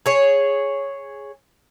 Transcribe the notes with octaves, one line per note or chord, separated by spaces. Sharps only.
G#4 C#5